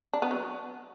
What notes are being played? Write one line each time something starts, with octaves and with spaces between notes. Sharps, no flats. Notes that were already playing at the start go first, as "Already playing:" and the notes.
D4
B3
F#3